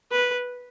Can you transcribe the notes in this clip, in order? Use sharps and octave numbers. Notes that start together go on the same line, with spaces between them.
B4